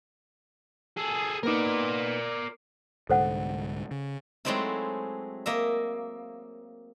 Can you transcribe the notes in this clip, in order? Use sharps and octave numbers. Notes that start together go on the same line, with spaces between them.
G#4 A4
A#3 B3 D#4 A#4 D5
C2 G#2 D3 A4 C5 F#5
C#3
F#3 G#3 A3 C4 D#4 E4
A#3 D#5 E5